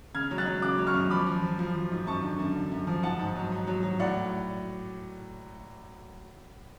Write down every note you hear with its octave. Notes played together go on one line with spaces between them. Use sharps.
C#3 F6 G#6
F#3
F#6 A6
F#3
C#3 D6 F#6
F#3
C#6 F6
F#2
F3 B5 D6
F3
F3
F3
F3
G#2
F#2 A5 C#6
D3
F#2
D3
F#2
F3
G#2 F#5 A5
G#2
F#3
G#2
F#3
F#3
A2 D5 F#5